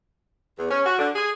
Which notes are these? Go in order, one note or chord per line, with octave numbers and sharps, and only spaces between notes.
E2
C#4
F#4
D3
G#4